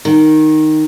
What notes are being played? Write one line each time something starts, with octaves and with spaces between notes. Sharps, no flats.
D#3